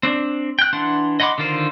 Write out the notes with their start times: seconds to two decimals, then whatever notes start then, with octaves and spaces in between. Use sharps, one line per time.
0.03 C4 D4
0.59 G5 F#6
0.73 E3 D4 F#5 C6
1.20 D#5 F#5 B5 C6 D6
1.38 D3 D#3 F4 A#4 C5